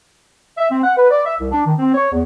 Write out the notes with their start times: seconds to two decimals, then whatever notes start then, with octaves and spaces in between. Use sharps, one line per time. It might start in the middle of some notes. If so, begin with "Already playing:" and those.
0.58 E5
0.71 C4
0.83 F#5
0.97 B4
1.11 D5
1.26 E5
1.39 C2
1.52 D4
1.65 D#3
1.79 C4
1.94 C#5
2.12 E2